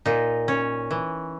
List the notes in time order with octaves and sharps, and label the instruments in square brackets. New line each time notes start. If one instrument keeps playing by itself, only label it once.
[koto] A#2 D#4
C#4
E3